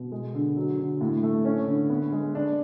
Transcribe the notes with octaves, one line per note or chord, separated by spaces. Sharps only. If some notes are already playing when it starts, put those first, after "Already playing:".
Already playing: B2
G#3
D3
F#3
D3
A2
A3
C#4
D3
B3
G#3
D4